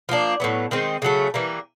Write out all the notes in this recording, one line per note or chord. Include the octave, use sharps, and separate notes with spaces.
F3 A#3 D4
A2 F#3 B3
D#3 G#3 C4
C#3 F#3 A3
E3 G3 A#3